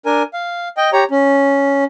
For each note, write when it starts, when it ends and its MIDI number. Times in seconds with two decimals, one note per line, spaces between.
0.06 0.23 62
0.06 0.23 70
0.06 0.23 80
0.33 0.68 77
0.77 0.90 75
0.77 0.90 79
0.93 1.04 67
0.93 1.04 73
0.93 1.04 82
1.11 1.84 61